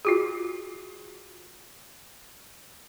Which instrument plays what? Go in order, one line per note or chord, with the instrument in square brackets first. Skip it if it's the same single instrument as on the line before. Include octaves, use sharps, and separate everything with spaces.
[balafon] F4 F#4 G#4